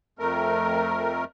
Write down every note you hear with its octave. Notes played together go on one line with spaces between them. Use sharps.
F2 A3 A#4